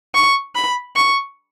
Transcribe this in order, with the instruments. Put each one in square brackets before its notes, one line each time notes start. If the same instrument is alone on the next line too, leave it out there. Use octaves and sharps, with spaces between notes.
[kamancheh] C#6
B5
C#6